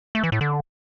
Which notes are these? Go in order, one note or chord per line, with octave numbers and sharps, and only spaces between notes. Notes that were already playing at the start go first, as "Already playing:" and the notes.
A3
E3
A2
D3